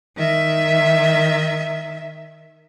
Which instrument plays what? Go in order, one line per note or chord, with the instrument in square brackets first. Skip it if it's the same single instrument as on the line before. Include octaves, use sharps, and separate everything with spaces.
[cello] D#3 E5